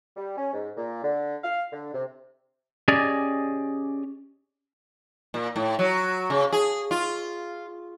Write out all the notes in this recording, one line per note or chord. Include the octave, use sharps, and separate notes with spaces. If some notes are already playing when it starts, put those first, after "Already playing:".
G3
C#4
G#2
A#2
D3
F5
D3
C3
C#4 G4 G#4 D5 D#5
A#2
A2
F#3
C#3
G#4
F4